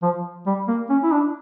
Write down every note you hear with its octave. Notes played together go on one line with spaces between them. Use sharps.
F3
G3
A#3
C#4
E4
D4